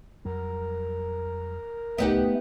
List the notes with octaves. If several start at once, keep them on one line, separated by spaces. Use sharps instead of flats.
F2 F#3 G3 A#4
D1 C2 A2 A3 B3 D#4 G4